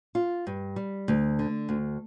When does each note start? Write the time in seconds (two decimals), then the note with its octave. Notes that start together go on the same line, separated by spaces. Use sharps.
0.15 F4
0.47 G2
0.76 G3
1.08 D2
1.39 D3
1.69 D2